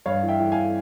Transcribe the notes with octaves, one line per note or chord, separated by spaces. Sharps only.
G2 C#5 F5
E3
E5 G5
E3
F5 G#5